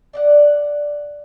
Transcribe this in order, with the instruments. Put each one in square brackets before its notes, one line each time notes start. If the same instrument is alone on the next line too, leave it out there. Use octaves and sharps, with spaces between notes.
[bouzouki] D5 D#5 F#5